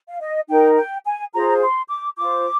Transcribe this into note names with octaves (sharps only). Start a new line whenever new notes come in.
F5
D#5
D#4 A#4 G5
G5
G#5
F4 G#4 C5 A#5
C6
D6
F4 C5 D6